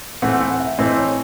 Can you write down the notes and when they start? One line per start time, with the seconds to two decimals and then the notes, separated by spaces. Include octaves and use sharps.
0.22 A2 E3 A3 C4 F#5
0.40 F#5
0.60 E5
0.78 A2 E3 A3 C4 D#5
0.97 C#5